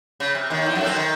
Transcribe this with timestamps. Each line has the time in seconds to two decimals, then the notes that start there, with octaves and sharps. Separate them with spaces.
0.20 C#3
0.35 C3
0.50 D#2 D#3
0.66 E2 E3
0.75 F#2 F#3
0.81 A3
0.86 C3 C4
0.96 D#3